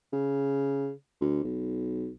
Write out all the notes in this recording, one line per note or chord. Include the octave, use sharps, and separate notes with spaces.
C#3
D2
B1